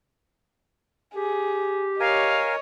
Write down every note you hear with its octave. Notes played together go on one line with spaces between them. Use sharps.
G4 G#4
A#4 C#5 D#5 F5 G#5